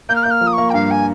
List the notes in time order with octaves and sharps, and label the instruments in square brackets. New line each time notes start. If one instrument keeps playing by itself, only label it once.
[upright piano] A#3 [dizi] G6
[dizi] F6
[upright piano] A#3 [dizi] G6
[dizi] F6
[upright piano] F3
[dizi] D#6
[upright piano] A#3 [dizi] C#6
[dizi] G5
[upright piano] G2 [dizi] F5
[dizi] G#5